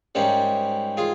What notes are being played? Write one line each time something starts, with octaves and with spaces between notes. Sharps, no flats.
G#2 G3 A#3 C#4
F4 G#4